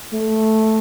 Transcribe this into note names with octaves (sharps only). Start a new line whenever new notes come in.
A3